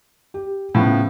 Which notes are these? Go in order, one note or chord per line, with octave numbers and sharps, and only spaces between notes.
G4
A2 C#3 F3 B3